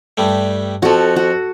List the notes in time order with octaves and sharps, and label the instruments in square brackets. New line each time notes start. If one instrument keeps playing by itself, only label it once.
[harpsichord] G2 G3 A3
[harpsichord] F2 F3 [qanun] F#4 A4
[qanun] F#4